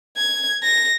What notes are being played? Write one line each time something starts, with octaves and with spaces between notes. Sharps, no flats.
G#6
A#6